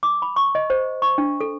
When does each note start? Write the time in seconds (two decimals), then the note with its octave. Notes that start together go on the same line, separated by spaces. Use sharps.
0.03 D6
0.22 B5
0.36 C#6
0.55 D#5
0.70 C5
1.02 C#6
1.18 D4
1.41 A4